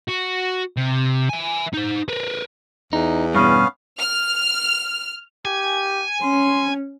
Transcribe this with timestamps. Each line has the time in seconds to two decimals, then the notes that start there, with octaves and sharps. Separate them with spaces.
0.09 F#4
0.77 C3
1.29 E5 G#5
1.74 D#4 C5
2.08 A#4 B4
2.93 E2 D#4
3.35 G2 B2 B3 C#4 F5
3.99 F6
5.45 G4 G#5
6.22 C#4 C6